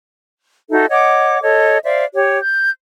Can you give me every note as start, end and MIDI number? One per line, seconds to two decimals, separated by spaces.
0.70 0.86 63
0.70 0.86 66
0.70 0.86 69
0.70 0.86 76
0.89 1.39 73
0.89 1.39 75
0.89 1.39 78
0.89 1.39 86
1.42 1.78 69
1.42 1.78 73
1.42 1.78 75
1.83 2.04 72
1.83 2.04 74
1.83 2.04 76
1.83 2.04 77
2.14 2.38 67
2.14 2.38 73
2.40 2.69 91